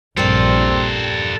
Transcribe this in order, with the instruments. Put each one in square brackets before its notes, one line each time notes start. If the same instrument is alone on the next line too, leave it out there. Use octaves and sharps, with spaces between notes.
[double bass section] A#1 [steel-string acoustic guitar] G2 G3 A#4 [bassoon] C4 [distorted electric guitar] A4 C5